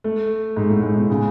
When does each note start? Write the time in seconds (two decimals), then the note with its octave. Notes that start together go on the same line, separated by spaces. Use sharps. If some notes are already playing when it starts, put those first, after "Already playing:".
0.04 A3
0.56 G#2
0.70 A2
0.83 G#2
0.96 B2
1.10 C#3